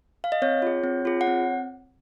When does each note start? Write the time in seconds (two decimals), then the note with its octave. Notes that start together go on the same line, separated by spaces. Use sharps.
0.24 F5
0.32 D#5
0.42 C4 C#5
0.62 F4 G#4
0.84 C4
1.05 F4 G#4
1.21 F#5
1.27 C4